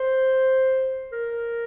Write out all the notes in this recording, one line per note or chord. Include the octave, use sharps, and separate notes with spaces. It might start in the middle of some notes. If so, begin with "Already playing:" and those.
Already playing: C5
A#4